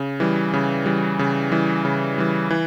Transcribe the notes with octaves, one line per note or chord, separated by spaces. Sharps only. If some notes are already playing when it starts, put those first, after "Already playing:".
Already playing: C#3
E3 G3
C#3
E3 G3
C#3
E3 G3
C#3
E3 G3
E3